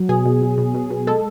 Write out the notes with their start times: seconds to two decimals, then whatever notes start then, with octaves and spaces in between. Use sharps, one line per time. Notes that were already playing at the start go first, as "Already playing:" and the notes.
Already playing: F#3
0.09 B2 G#4
0.25 B2
0.42 B2
0.58 B2
0.74 B2
0.90 B2
1.07 G#3 A4